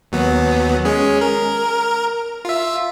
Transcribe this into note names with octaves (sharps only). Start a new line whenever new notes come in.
D#2 F#3 B3
G#3 C#4 G#4
A#4
F4 E5